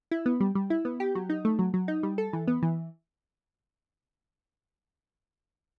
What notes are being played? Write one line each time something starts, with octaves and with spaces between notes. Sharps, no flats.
E4
B3
G3
G3
E4
B3
G4
F#3
D#4
A3
F#3
F#3
D#4
G3
A4
E3
B3
E3